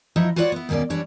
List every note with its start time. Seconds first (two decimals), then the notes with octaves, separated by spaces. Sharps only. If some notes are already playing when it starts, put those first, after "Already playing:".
0.16 F3 D#4 E4 D#5 E5
0.36 F4 F#4 B4 C#5 D5 F#5
0.52 B3 E4
0.69 D#2 B2 A#3 C#4 D5
0.90 E3 G3 D4 C#5 D5